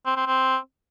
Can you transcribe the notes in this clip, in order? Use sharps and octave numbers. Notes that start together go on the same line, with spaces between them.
C4
C4
C4